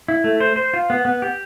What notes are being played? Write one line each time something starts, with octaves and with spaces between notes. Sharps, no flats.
E4
A3
C5
C5
F4
B3
B3
G4